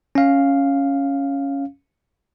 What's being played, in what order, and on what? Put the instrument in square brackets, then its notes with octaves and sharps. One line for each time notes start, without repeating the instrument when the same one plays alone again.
[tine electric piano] C#4 F5